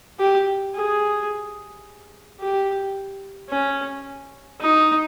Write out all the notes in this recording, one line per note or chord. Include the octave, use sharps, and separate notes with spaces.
G4
G#4
G4
C#4
D#4